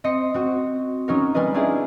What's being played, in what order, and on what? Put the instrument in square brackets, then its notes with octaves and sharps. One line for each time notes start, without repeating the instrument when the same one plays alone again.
[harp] C4 D#5 C6 C#7
C4 F#4
F#3 C#4 D#4 F#4 A#4
G3 G#3 A#4 B4 D#5
D4 E4 F4 G4 G#4 D#5